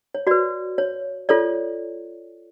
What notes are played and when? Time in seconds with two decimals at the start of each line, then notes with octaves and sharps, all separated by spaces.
0.15 C#5
0.27 F#4 B4 D5
0.78 C#5
1.29 F4 A4 C#5 D5